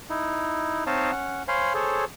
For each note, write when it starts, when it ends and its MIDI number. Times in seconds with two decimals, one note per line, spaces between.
0.10 0.84 63
0.10 0.84 64
0.87 1.11 60
0.87 1.11 63
0.87 1.11 73
0.87 1.11 75
0.87 1.11 77
0.87 1.11 81
1.12 1.43 61
1.12 1.43 78
1.48 1.73 72
1.48 1.73 73
1.48 1.73 77
1.48 1.73 80
1.48 1.73 83
1.48 1.73 84
1.74 2.05 68
1.74 2.05 69
1.74 2.05 72
1.74 2.05 73